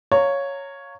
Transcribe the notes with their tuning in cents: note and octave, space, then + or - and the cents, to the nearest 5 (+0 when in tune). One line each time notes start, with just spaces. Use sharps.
C#5 +0 F5 +10 A#5 -25